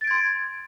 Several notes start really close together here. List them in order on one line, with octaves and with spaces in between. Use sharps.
A6 D7 G#6 C6